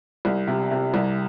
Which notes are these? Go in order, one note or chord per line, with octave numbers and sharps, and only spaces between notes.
C2
C3
C3
C2